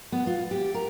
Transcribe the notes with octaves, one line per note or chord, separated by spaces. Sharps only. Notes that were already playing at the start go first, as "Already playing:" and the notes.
B3
F4
G4
A#4